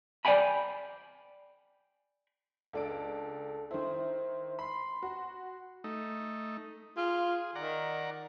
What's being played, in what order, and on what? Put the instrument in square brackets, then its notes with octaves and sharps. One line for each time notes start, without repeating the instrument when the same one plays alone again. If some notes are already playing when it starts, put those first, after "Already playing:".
[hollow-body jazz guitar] C5 D5 F5 G5 G#5 B5
[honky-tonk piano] C#2 D4 D7 [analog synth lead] A4
[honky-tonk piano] D#3 E4 [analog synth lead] C5
[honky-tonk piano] B5 [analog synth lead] C6
[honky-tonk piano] F#4
[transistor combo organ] A3 D#4
[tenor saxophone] F4 [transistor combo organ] G#4
[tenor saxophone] D#3 [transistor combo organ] D5 F#5 A#5